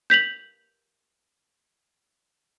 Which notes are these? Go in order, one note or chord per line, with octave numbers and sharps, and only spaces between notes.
G6 B6 F7 F#7